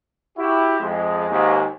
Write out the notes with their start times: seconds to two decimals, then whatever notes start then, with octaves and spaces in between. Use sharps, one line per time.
0.38 E4 F#4 G4
0.81 F2 G#3
1.30 D#2 G#2